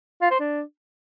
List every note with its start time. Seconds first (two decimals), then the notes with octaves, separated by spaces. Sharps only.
0.22 F4
0.31 C5
0.40 D4